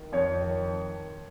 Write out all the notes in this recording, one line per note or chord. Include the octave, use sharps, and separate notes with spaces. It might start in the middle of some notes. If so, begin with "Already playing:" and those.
Already playing: D#3
F2 C#5
D#3